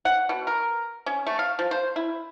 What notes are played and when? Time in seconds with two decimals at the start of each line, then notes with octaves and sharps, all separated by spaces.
0.05 F#5
0.29 B2
0.47 A#4
1.06 C#4
1.27 A3
1.39 F5
1.59 F3
1.71 C5
1.96 E4